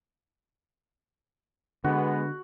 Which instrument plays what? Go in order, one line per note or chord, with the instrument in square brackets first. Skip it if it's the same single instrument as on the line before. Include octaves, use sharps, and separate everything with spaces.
[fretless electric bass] D3 [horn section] G#3 B3 [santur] F#4